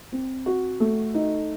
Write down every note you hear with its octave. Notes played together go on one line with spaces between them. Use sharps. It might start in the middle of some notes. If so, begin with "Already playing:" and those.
C4
F#4
A3
D#4